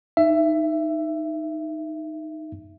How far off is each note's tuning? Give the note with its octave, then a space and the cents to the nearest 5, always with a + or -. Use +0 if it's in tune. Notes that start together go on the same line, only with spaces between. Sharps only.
D#4 +0 E5 +15